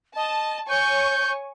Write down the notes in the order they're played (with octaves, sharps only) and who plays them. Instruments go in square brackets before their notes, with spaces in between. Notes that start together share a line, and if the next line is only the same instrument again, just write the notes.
[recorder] D#5 [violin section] A5
[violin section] C#5 G#5 C#6 [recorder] G6